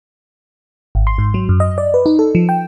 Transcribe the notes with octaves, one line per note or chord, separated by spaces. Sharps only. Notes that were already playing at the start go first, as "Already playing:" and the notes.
G#1
C6
G#2
F#3
F#2
D#5
D5
B4
D#4
A4
F3
G5